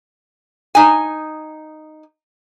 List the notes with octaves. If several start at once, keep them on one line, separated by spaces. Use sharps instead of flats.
D#4 G#5